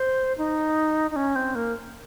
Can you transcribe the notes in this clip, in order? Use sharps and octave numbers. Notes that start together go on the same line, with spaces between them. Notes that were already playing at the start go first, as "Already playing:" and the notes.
Already playing: C5
D#4
D#4
C#4
C4
A#3